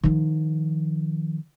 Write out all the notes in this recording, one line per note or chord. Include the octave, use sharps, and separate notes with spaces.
D#3 F3